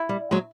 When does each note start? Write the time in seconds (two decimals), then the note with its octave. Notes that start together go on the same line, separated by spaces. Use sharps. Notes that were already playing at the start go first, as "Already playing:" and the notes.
Already playing: E4
0.09 G3
0.31 F#3 G#3